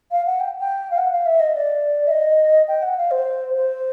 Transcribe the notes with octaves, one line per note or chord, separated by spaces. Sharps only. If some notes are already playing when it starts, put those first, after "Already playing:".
F5
F#5
G5
G5
F5
F#5
F5
E5
D#5
D5
E5
D#5
G5
F#5
F5
C5
C5